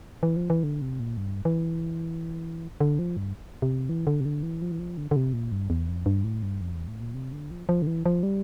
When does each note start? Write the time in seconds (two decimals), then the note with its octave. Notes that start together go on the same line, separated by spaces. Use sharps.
0.23 E3
0.36 F3
0.50 E3
0.63 D3
0.82 C3
1.00 A#2
1.17 G2
1.45 E3
2.81 D3
2.99 F3
3.17 G2
3.62 C3
3.89 E3
4.07 D3
4.21 C3
4.25 D3
4.43 E3
4.62 F3
4.72 E3
4.79 F3
4.97 D3
5.11 D3
5.16 C3
5.33 A#2
5.52 G2
5.70 E2
5.88 F2
6.06 G2
6.24 A2
6.43 G2
6.61 F2
6.74 E2
6.88 A2
7.01 A#2
7.14 C3
7.33 D3
7.51 F3
7.69 F3
7.82 D3
7.87 E3
8.06 F3
8.23 G3